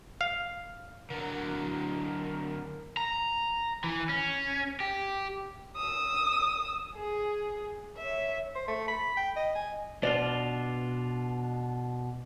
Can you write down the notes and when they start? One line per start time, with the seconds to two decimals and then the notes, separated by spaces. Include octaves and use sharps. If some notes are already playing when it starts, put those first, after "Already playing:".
0.21 F5
1.10 D3 F#3 A#4
2.97 A#5
3.84 E3
4.09 C#4
4.80 G4
5.76 D#6 E6
6.95 G#4
7.97 C#5 E5
8.55 C5
8.68 A3
8.88 B5
9.17 G5
9.36 D#5
9.55 G#5
10.03 B2 D4 F4 D5